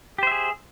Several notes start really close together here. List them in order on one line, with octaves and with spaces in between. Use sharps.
G4 C5 E5 G#4